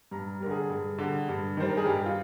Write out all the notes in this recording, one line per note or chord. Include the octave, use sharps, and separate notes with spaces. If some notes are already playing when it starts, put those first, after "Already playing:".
G2 A#5
G3 A#4
D3 G#4
G2
D3 G3
G2
D#3 G3 C5
A#4
G#4
G2 G4
F4